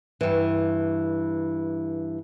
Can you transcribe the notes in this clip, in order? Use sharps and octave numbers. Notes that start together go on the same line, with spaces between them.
G2 E3